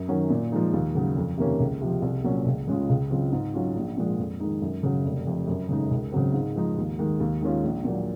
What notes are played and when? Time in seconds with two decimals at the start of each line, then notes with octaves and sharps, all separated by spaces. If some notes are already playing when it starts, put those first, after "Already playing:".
Already playing: F#2
0.08 D#3 F#3 C#4
0.30 A#2
0.52 F3 G#3 D#4
0.73 D#2
0.95 C#3 F#3
1.16 F2
1.37 C3 D#3 A#3 C#4
1.60 C#2
1.81 C3 F3
2.02 C2
2.24 A#2 F#3 C#4
2.46 C#2
2.68 C#3 G#3 C#4 F4
2.89 C#2
3.10 C#3 F#3 C4 F4
3.32 G#2
3.53 F#3 C#4 F4
3.76 A#1
3.97 A#2 F3 G#3
4.18 F2
4.40 D#3 G#3 D#4
4.62 F#2
4.83 C#3 F#3
5.05 F1
5.27 F2 C3
5.47 F#2
5.69 C#3 G#3 D#4
5.91 C#2
6.12 C#3 F#3 C4
6.33 G#2
6.56 F3 G#3 D#4
6.77 D#2
6.99 D#3 G#3
7.20 D#2
7.42 D#3 G#3 C#4 F4
7.64 A#1
7.84 A#2 F#3